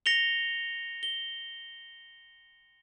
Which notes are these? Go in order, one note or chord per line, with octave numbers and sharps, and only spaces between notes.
A#6 C#7 F7 G7
G7